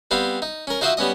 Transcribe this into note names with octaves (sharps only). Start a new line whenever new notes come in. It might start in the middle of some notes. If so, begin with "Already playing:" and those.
G3 B3 C4 F5
D#4
C#4 A#4
D#4 F4 F#4 C5 D#5 E5
G3 B3 C#4 D#5